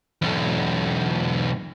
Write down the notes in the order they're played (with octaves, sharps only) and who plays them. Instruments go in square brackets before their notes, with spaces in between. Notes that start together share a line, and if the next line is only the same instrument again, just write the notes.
[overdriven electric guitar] B1 E2